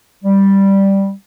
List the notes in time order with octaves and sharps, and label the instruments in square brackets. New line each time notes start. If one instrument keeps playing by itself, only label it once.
[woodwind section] G3